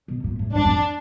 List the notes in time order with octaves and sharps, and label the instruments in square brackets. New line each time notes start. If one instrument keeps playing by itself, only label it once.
[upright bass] B2
A#2
A2
[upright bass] G#2 [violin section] D4
[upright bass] F2